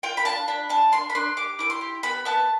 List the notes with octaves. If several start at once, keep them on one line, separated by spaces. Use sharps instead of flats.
F4 G5
B5
D4 A5
D4 B5
D4 A5
D4 C6
B5
D4 C6
G4 D6
E4 D6
C6
G4
B3 B5
B3 A5